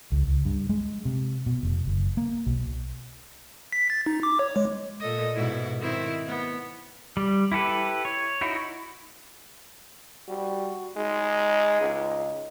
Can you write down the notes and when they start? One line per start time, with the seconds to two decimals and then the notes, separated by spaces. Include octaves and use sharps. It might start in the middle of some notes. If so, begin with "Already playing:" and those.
0.12 C#2
0.27 C#2
0.45 G2
0.69 G#3
1.05 C3
1.46 B2
1.63 F1
1.87 F#1
2.17 A#3
2.47 B1
3.72 B6
3.90 A6
4.06 D#4
4.23 D6
4.39 C#5
4.56 G#3
5.00 A#2 A4 D#5
5.35 G#2 B2 E4
5.79 D#3 C4 E4
6.27 B3
7.17 G3
7.52 E4 G4 A4 B4
8.05 C#5
8.41 D#4 E4 F#4
10.29 G3 F#4
10.97 G#3 D#4
11.81 C#2